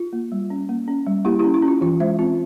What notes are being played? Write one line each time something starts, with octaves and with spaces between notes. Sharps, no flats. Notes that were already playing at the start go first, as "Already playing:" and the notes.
Already playing: F4
A#3
G3
C#4
A#3
C#4
G3
A#3 E4 G4
E4 G4
C#4
E4
C#4
F4
E3 F4
G#3 C5 E5
C4 F4